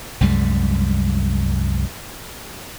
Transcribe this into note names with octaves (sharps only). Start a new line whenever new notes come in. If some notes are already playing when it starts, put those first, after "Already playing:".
C2 F#2 G3 G#3